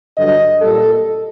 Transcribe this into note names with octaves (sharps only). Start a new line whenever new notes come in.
G2 D3 F#3 D#5
A#2 G3 A4